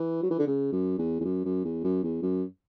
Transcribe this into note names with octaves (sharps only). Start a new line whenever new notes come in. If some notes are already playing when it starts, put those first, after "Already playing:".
Already playing: E3
F#3
E3
D3
C#3
F#2
E2
E2
F#2
F#2
E2
F#2
E2
F#2